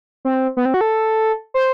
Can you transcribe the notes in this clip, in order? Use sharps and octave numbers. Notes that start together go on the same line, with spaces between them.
C4
B3
C4
F#4
A4
C5